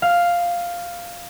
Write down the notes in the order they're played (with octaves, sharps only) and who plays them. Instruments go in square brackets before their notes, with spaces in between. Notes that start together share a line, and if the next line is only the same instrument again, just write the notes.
[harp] F5